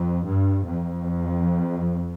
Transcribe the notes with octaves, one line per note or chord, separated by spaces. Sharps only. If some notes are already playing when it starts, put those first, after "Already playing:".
Already playing: F2
G2
F2